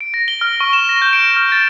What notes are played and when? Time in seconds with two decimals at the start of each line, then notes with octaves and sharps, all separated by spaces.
0.01 D7
0.14 A#6
0.28 G7
0.41 F6
0.60 C#6
0.73 E7
0.89 A#6
1.02 G6
1.13 D7
1.36 F6
1.52 A6